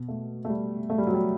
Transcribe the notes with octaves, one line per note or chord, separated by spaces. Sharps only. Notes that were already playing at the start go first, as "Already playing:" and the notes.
Already playing: B2
A3
A3
G3
A3
G3
F#3
G3